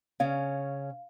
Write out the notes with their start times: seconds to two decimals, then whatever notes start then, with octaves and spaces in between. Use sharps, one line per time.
0.20 C#3 C#4 F5